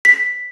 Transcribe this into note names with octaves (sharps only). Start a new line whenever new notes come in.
B6